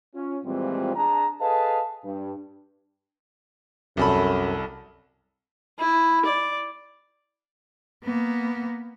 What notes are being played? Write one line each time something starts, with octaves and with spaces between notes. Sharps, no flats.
C#4 F4
A#2 E3 F3 G3 G#3 C4
D4 G#4 A5 A#5
G#4 A4 B4 D#5 F5 A5
G2
C2 F#2 A4 B5
E4
D5
A#3 B3